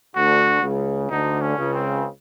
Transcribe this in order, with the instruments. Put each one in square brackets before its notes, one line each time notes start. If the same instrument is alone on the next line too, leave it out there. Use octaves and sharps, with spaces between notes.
[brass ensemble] D2 D3 [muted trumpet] F#4
[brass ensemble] C#2 C#3
[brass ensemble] D2 D3 [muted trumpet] D#4
[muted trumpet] C#4
[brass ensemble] C#2 C#3
[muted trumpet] C4